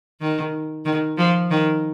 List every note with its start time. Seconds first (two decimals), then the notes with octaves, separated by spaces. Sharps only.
0.21 D#3
0.85 D#3
1.18 F3
1.51 D#3